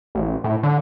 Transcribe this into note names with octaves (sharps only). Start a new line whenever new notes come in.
A1
A2
D3